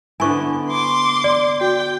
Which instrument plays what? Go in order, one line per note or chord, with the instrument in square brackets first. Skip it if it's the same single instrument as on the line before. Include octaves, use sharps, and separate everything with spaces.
[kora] D3 B3 E4 [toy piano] G#5 C#6
[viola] C6 D6
[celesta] D5
[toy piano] F#4 [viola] G5